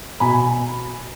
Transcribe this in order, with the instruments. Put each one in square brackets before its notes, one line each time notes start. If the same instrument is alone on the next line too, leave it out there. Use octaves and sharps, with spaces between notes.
[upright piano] B2 G#5 B5